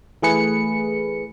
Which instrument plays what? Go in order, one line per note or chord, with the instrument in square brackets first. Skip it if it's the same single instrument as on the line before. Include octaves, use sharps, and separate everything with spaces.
[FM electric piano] E3 A3 G#4 B4 C#7